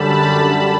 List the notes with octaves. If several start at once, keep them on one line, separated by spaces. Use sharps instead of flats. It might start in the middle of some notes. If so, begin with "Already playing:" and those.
Already playing: F#2 D3 G3 A5 B5